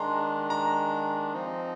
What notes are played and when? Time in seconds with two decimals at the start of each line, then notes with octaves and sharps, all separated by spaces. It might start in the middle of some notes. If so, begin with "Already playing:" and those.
Already playing: D#3 G#3 D4 A#5 C6
0.50 A#5
1.33 F3 C4 D#4